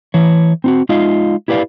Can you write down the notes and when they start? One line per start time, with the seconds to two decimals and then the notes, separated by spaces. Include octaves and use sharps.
0.14 E3 C#5
0.64 C4 D#4 F#4
0.89 G#3 D#4 F4 D#5 F5
1.48 E4 G4 B4 D5 F5